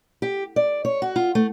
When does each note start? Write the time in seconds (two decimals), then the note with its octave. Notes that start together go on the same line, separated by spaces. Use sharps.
0.22 G4
0.56 D5
0.85 C#5
1.02 F#4
1.16 F4
1.35 A3